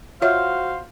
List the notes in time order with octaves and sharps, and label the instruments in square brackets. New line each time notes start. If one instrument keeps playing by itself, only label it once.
[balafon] F4 C#5 E5 [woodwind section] F#4 C5 F5